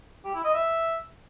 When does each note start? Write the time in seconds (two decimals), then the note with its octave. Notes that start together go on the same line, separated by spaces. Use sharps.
0.24 G4
0.34 E4
0.44 D#5
0.54 E5